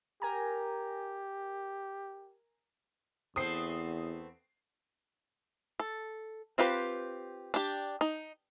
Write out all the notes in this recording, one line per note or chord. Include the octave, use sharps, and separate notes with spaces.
G4 A#4 G#5 A#5
E2 A3 B3 C4 D#6 C7
A4
C4 F4 G4 B4
D4 G4
D#4